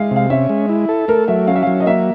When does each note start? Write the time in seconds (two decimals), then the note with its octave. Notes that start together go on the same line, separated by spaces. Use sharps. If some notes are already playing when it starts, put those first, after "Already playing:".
Already playing: G#3 E5 F5
0.11 C3 F5
0.30 C#4 E5
0.49 G#3
0.69 E4
0.89 A4
1.08 A3 A#4
1.28 F#3 E5
1.47 C#4 F5
1.56 E5
1.63 F#3 F5
1.80 D#5
1.86 A#3 E5